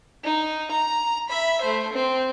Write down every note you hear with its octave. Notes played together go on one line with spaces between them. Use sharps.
D#4
A#5
E5 B5
A3 C5
C4